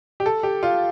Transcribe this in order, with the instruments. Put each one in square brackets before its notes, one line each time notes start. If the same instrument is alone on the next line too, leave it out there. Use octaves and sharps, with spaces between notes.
[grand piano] G4
A4
G4
F4